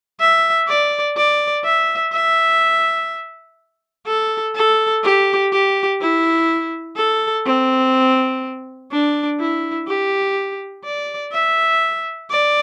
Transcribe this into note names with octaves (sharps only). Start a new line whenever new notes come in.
E5
D5
D5
E5
E5
A4
A4
G4
G4
E4
A4
C4
D4
E4
G4
D5
E5
D5